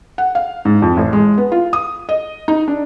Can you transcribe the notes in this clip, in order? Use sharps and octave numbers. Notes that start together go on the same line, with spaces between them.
F#5
F5
G#2
F2
A1
G#3
B3
F4
D#6
D#5
D#4
D4